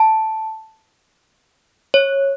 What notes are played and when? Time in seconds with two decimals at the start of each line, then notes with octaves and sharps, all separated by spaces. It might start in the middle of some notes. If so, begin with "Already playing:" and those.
Already playing: A5
1.94 C#5